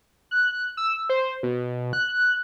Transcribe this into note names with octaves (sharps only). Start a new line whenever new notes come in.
F#6
E6
C5
B2
F#6